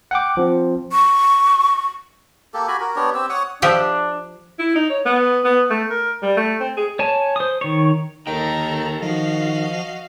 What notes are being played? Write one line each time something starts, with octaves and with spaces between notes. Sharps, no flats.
F#5 G5 D6
F3 C4
C#6
A#3 G4 A4
F#4 G4 G#5 B5
F#4 A#4
B3 D4 G4 C#5
C4 G4 E6
C#5 F#5 C#6 D#6
F3 D4 G4 E5
E4
D#4
C#5
B3
B3
A3
A#4
G3
A3
C4
G#4
C#5 G#5 A5
C5 D#6
D#3 C#5
D#2 D#4 A4 A#4 G5 A#5
D#3 F3 F#4 D#5 F5